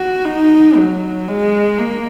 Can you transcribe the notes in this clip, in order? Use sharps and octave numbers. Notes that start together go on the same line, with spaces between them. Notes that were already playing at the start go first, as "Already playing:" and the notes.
Already playing: F#4
D#4
F#3
G#3
A#3